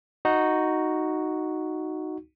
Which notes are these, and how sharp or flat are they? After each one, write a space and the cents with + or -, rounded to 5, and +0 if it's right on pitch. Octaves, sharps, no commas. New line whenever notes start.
D#4 +0 F#4 +0